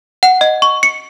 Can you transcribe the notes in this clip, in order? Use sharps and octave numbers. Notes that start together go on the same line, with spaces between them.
F#5
D#5
C#6
C#7